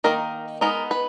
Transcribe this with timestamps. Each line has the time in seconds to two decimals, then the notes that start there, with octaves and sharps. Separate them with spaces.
0.04 D#3 A#3 D#4 A#4
0.61 G#3 B3 D#4 A#4
0.91 B4